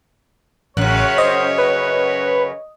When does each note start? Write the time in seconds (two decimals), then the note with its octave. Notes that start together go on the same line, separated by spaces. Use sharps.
0.77 A1 F#2 C#3 C#5 F#6
1.18 C5 D#5
1.58 B4